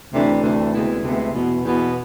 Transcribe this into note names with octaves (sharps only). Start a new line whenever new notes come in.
D2 C3 E3 A3 D4
D2 C3 E3 A3 D4
D2 C3 G#3 B3 E4
D2 C3 G#3 B3 E4
E2 B2 B3
E2 B2 B3